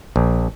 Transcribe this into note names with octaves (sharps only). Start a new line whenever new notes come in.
A#1